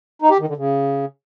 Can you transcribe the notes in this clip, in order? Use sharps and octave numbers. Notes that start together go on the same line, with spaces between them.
D#4
G4
D#3
D3
C#3